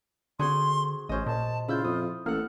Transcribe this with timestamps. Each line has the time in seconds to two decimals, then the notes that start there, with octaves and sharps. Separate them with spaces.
0.39 D3 C4 F#4 G#4 C6
1.09 A1 C#4 C5 D#5
1.26 A#2 A5
1.68 C#3 E4 F4 E6 G6
1.84 F2 D#6
2.26 A1 A#3 A4 F#5 F6